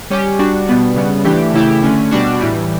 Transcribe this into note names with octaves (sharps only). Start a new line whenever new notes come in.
G3 C#4 G4
G3 D4 F#4
B2 G3 B3 D4
C#3 G3 B3
E3 A3 D4 G4
C#3 E3 A3 E4 G4
D3 A3 C#4
B2 G3 D4 F#4
A2 E3 G3